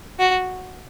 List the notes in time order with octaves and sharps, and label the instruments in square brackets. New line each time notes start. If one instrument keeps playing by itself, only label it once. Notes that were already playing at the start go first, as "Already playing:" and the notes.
[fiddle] F#4